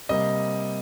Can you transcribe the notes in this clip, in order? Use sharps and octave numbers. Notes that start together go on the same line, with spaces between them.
C3 G3 A#3 D#5